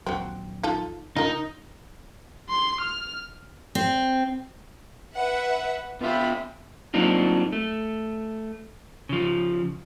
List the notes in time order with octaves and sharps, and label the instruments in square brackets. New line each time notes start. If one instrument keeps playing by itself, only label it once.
[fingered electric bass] A#1 D#2 F#3 [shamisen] C4 F#4
[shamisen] D#4 F4 A4
[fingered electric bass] C#3 D4 [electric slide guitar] D#4 [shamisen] F4 A#4
[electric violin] C6
F6
[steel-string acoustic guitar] C4
[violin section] B4 E5 F#5
[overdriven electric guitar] B2 E5 [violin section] F4 B5
[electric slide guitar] F#3 A#3 C4 D4 D#4 F4
A3
C#3 F3